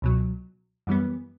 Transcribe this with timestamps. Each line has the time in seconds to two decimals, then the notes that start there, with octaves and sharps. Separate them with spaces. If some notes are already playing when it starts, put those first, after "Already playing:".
0.02 C#2 B2 F#3
0.87 F#2 E3 G3 B3